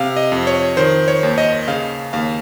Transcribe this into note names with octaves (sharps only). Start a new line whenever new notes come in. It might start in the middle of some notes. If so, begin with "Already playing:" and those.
Already playing: C3 F5
D#5
F2
C#5
D#3 C5
C#5
D#2
D#5
C#3 F5
D#2 F5